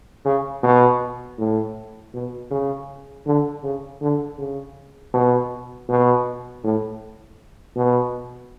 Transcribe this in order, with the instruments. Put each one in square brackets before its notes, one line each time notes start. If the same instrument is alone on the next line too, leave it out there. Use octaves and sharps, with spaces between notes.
[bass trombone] C#3
B2
A2
B2
C#3
D3
C#3
D3
C#3
B2
B2
A2
B2